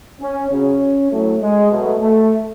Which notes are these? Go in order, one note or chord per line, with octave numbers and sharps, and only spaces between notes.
C#4
C#3 F#3 C#4
A2 F#3 A3
G#3
B2 F#3 A3
A3